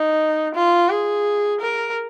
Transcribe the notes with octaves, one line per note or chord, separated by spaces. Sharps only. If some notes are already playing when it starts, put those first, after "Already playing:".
Already playing: D#4
F4
G#4
A#4